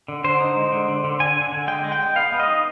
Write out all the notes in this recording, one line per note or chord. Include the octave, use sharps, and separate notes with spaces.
D3
D3 C5
D#4
G#3
D3
D3
D3
D3 G#5
D3
D3
G#3 G5
G#3
G5
G#3
B3 F5
B3
D#5
D#4